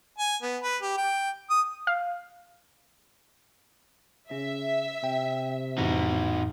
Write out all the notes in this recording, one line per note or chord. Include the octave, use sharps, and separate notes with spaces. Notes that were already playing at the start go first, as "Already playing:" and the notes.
G#5
B3
B4
G4
G5
D#6
F5
C#3 C#4 E5
C3 G5
F2 A2 E3 D#4 F#4